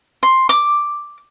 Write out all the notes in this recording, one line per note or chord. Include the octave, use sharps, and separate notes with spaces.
C6
D6